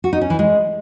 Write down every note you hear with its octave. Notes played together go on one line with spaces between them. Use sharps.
F#4
D#4
C#4
E3
G#3